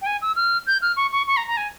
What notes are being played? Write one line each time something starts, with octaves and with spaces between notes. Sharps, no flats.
G5
G#5
E6
F6
G6
F6
C#6
C#6
C#6
A#5
A#5
G#5